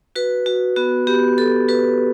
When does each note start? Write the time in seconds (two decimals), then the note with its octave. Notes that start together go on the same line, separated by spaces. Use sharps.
0.16 F#4 B4
0.46 F#4
0.76 B3 F#4
1.07 B3 G4
1.38 F#4 A4
1.68 F#4 B4